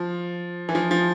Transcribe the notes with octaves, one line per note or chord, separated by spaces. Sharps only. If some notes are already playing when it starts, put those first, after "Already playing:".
Already playing: F3
E3
F3
F3